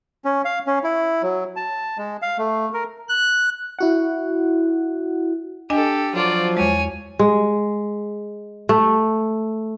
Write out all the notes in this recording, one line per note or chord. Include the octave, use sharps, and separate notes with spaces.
C#4
F5
C#4
E4
F#3
A5
G#3
F5
A3
A#4
F#6
E4 F#4 F#5
D4 G4 A4 D#5 G#5
F3 F#3 F4 D5
E2 G#3 C#5 G#5
G#3
A3